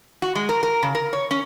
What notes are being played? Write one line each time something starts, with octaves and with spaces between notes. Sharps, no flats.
F#4
G#3
A#4
A#4
C#3
A#4
C#5
C#4